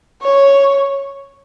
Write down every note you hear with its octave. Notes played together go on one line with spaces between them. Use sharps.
C#5